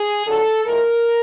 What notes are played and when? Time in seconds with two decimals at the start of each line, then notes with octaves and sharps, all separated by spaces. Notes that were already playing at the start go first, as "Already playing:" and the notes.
Already playing: G#4
0.26 F2 D3 F#3 A4
0.65 A2 F3 G#3 A#4